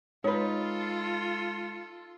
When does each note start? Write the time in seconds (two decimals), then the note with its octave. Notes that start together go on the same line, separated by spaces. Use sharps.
0.24 G#3 D#4 F4 A4 B4 C#5